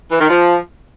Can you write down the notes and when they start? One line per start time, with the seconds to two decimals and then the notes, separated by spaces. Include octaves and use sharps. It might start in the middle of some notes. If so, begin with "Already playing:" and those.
0.11 E3
0.20 D#3
0.29 F3